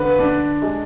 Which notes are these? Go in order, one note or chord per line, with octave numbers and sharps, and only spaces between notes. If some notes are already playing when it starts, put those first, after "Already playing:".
Already playing: D3 B4
D4
G#3